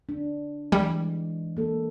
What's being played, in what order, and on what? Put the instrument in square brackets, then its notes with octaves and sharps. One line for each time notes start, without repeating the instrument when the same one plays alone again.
[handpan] D4
[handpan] E3 G#3 [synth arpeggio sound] G3
[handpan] A#3 A4